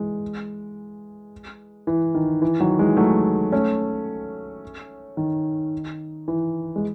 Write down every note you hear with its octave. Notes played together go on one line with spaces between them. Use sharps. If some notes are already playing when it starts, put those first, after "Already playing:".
Already playing: E3 G#3
E3
D#3
E3
D#3 F#3
E3 G#3
F#3 A3
A3 C#4
D#3
E3
G#3